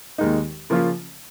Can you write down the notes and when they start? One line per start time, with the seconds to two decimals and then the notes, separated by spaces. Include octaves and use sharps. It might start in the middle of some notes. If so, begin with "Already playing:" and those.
0.18 D#2 D#3 G#3 D#4
0.70 C#3 F3 A#3 C#4 F4